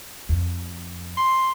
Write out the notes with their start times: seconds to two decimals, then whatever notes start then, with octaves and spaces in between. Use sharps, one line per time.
0.29 F2
1.17 C6